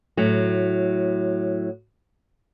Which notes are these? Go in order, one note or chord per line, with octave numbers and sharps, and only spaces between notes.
A2 F#3